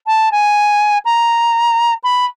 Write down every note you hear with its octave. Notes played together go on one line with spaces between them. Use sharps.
A5
G#5
A#5
B5